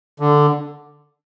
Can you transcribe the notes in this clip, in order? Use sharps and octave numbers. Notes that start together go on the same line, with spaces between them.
D3